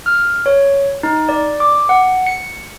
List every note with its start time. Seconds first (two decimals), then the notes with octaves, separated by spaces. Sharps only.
0.06 F6
0.46 C#5
1.03 D#4
1.29 D5
1.60 D6
1.89 F#5
2.27 C#7